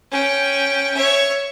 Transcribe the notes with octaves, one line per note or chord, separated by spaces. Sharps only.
C#4 G5
C#5 E5